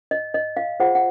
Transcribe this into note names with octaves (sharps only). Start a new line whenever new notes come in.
D#5
D#5
F5
F4 G#4 C5 F#5
F#5